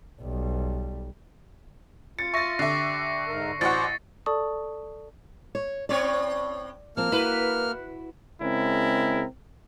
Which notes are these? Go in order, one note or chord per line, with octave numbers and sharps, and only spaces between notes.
B1 G3
F4 A6 C#7
E5 C#6 A6 A#6
D3 G4 E5 C7
G#2 A#4
A1 F#4 C5 D5 F#5 A6
A4 D5 A5 C#6 D#6
C#5
A2 C4 C#5 D5
F3 A#3 C4 F6
E4 F#4 B4
C#3 G#3 C4 E4 A#4